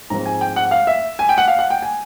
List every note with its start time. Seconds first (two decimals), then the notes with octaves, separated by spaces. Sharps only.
0.10 G#2 F3 G#3 C4 A#5
0.26 G#5
0.41 G5
0.56 F#5
0.71 F5
0.87 E5
1.19 G#5
1.29 G5
1.38 F#5
1.48 F5
1.59 F#5
1.70 G5
1.82 G#5